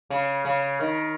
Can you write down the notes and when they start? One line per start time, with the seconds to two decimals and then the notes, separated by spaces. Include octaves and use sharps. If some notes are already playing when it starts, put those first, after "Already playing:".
0.10 C#3
0.45 C#3
0.81 D#3